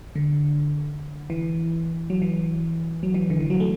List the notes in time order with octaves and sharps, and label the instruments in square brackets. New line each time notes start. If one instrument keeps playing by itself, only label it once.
[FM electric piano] D3
E3
F#3
E3
F#3
E3
D3
E3
F#3
A3